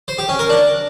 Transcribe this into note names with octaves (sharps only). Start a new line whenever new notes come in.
C5
G4
C#4
A#4
D4